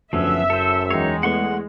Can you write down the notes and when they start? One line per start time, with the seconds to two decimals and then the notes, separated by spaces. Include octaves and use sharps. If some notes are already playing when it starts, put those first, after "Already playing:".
0.13 F#1 D2 F3 B3 C#4 E5
0.50 F#2 A4 C5
0.90 E2 G#3 D#4 C#5 G5 C7
1.23 E2 A3 B3 F#5 C6 C#6